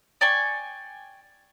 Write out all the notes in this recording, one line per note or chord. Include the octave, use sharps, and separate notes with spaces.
D5 G5 G#5 C#6